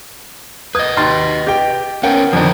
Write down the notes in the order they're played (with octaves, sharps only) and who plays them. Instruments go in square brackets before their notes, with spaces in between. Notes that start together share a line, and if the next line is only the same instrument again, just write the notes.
[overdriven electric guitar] B4 D#5 [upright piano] D#6 G6 G#6
[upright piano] D#2 C6 A6
G4 G5
[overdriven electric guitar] B3 C#4 [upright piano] A#4 F#5 G5
[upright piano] F2 D3 D#3 [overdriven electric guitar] F3 A#4